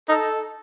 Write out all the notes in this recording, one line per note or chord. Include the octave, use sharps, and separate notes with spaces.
D#4 A4